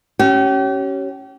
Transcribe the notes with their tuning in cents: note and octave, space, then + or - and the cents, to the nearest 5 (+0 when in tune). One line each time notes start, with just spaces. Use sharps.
C#4 +0 G4 -40